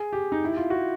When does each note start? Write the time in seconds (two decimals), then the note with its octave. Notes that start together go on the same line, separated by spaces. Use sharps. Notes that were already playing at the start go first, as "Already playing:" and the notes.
Already playing: G#4
0.13 G4
0.32 D#4
0.44 E4
0.57 F4
0.70 F#4